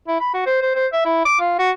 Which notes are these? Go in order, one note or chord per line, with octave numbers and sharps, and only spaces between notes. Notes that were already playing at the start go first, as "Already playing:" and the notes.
E4
B5
F#4
C5
C5
C5
E5
E4
D6
F4
F#4